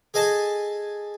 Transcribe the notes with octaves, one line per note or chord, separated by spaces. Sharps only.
G#4 A4 D#5 G#5 A5